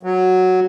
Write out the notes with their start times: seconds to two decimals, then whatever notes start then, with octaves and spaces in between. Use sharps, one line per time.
0.03 F#3